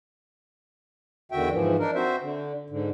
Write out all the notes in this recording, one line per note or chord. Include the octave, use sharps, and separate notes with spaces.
E2 D3 D#3 F#4 E5 G5
G#2 E3 F3
D4 D#4 A#4
C4 F#4 C5 E5
D3
G#2 D3